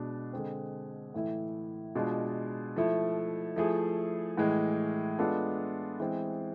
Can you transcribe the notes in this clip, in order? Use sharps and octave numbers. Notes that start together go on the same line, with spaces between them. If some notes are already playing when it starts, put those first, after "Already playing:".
Already playing: B2 G#3 D4
D3 G#3 C4
A2 E3 A3 E4
B2 G#3 D4 F4
F3 A3 E4
F3 A3 E4 G#4
A2 E3 G#3
G#3 B3 D4 F4 A4
E3 G#3 C4